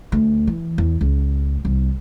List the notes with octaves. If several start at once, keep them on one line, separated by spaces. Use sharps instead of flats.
D2
E3
E2
C#2
C2